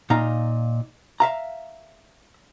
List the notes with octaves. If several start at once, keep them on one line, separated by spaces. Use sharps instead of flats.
A#2 D#4 F5 A#5
E5 F5 A#5